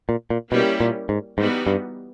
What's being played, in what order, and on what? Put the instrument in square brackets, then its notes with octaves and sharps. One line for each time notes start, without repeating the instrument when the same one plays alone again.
[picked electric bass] A#2
A#2
[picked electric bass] B2 [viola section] G3 A#3 C#4 E4 G4
[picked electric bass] A#2
G#2
[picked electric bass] G#2 [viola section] E3 G3 B3 D#4 F#4
[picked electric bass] G2